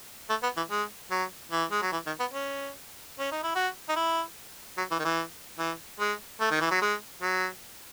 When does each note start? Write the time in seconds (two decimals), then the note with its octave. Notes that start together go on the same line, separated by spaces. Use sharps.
0.30 A3
0.43 B3
0.57 E3
0.70 G#3
1.11 F#3
1.52 E3
1.71 G#3
1.82 F#3
1.92 E3
2.06 D#3
2.20 B3
2.33 C#4
3.19 C#4
3.32 D#4
3.44 E4
3.55 F#4
3.89 D#4
3.96 E4
4.78 F#3
4.91 E3
4.99 D#3
5.05 E3
5.59 E3
6.00 G#3
6.40 A3
6.51 D#3
6.61 E3
6.71 F#3
6.81 G#3
7.22 F#3